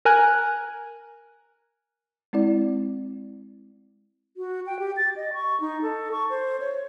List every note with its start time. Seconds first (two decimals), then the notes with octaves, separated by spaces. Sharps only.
0.05 A#4 G#5 F#6
2.33 G#3 C4 E4 D5
4.37 F#4
4.66 G5
4.79 G4
4.97 A6
5.16 D#5
5.33 C#6
5.60 D#4
5.82 A4
6.12 C#6
6.30 C5
6.60 C#5